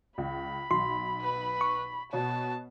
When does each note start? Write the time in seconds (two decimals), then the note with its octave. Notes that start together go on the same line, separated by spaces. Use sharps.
0.18 C#2 B5
0.71 B1 C6
1.21 B4
1.61 C#6
2.13 B2 B3 C#5 A5